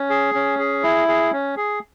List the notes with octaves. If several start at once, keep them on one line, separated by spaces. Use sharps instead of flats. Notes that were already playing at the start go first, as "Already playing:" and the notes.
Already playing: C#4
G#4
C#4
G#4
E4
G#4
C#4
G#4